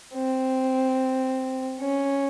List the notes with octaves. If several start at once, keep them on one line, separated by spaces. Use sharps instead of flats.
C4
C#4